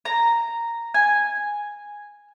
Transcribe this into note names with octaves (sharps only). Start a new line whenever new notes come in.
A#5
G#5